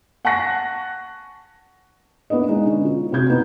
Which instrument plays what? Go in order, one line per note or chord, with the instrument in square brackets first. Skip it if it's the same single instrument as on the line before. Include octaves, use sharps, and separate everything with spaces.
[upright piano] F#5 G#5 A5 C#6 F#6 A#6
[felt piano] A#3 B3 D4 B4 D#5
G#3 D#4
D3 C#4
F4
C3 C4 F#4 G6 G#6
B3 D#4